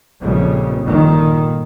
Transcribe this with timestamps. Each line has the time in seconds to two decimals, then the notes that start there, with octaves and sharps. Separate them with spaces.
0.20 A#1 F2 C#3 G3
0.83 G1 A#2 D#3